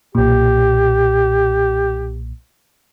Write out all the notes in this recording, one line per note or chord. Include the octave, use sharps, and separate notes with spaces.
B1 A#2 G4